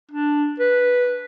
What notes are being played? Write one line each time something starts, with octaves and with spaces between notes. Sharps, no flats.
D4
B4